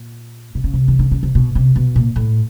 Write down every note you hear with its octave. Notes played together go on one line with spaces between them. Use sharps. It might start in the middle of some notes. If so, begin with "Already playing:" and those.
Already playing: A#2
C3
C#3
C3
D#3
D3
C#3
C3
B2
C3
B2
A#2
A2